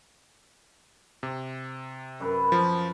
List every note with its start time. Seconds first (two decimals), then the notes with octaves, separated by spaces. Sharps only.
1.23 C3
2.20 F#2 B4 B5
2.52 F3